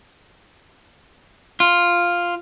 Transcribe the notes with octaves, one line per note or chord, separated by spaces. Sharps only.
F4